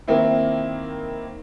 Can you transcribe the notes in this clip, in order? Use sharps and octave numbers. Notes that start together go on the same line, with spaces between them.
D#3 A#3 C4 E4